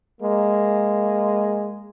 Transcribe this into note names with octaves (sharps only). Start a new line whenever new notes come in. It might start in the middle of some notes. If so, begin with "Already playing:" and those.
G#3 A#3